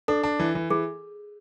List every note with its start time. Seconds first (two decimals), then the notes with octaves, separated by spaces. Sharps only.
0.08 D4 A4
0.23 D4
0.39 E3
0.55 E3
0.70 E3 G#4